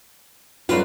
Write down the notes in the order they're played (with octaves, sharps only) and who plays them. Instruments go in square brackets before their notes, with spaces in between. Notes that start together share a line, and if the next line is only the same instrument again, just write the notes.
[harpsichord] B1 G3 B4 [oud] F#2 F4